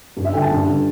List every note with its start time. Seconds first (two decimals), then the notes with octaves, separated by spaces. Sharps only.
0.17 G2
0.25 E5
0.33 D3 G5
0.42 A5
0.51 G2
0.67 D3